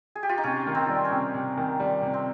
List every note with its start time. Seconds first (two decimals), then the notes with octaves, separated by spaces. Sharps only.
0.15 G#4
0.23 G4
0.29 F4
0.38 D#4
0.43 C3 C#4
0.67 D#3
0.75 C4
0.89 G3
1.05 C#4
1.12 C3
1.34 C3
1.58 D#3
1.80 G3
2.02 C3
2.14 C4